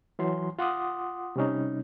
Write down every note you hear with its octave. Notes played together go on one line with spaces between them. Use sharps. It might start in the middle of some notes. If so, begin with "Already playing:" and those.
E3 F#3 C6
F4 F#5 C6 D6 D#6
C3 G3 C#4 D#4